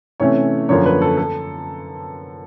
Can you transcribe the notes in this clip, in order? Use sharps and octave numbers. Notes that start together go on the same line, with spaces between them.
C3 E3 A3 C#4 C#5
F#2 D3 F3 A#3 C#5
B4
A4
A4